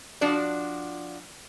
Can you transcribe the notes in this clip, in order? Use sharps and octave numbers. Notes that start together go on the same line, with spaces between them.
F3 D4 F#4 D5